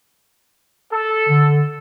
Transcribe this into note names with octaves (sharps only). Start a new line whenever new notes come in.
A4
D3